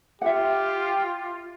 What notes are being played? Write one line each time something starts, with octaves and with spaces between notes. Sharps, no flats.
F4 G4 E5 F#5